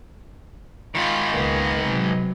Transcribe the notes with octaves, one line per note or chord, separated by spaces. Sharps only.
G#2 D#3 F4 B5
C#2 A#3 B3 D#5
C3 F#3